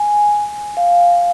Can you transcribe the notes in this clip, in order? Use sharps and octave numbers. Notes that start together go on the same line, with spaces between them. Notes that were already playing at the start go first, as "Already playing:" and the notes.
Already playing: G#5
F5